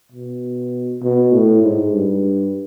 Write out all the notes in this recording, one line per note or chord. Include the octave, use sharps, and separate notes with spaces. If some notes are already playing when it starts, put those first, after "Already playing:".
B2
B2
A2
G#2
G2